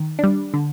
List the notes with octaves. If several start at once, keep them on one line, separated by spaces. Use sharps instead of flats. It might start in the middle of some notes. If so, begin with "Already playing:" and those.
Already playing: D#3
G3 D4
D3